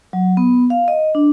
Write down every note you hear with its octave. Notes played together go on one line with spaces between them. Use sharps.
F#3
B3
F5
D#5
D4